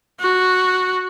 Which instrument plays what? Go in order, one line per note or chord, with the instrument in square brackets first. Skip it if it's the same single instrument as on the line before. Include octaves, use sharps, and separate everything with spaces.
[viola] F#4